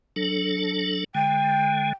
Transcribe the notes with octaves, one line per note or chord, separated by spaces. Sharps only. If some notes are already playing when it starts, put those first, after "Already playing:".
F#3 D4 A4
D3 G#3 G5